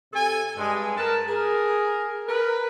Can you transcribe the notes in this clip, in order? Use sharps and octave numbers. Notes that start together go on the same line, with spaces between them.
C3 A4 G#5
G2 G#3
A#4 B4 A5
G#4 A#4
A#4 B4